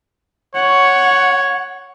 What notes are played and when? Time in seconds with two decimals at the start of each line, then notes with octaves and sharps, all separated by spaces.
0.55 C#5 F#5